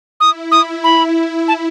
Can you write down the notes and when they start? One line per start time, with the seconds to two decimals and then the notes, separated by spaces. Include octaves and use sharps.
0.20 E4 D#6
0.52 D#6
0.84 B5
1.48 A5